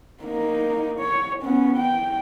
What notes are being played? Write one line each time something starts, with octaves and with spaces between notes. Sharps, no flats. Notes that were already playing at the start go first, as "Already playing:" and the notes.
A#3 D#4
C#5
B3 C#4
G5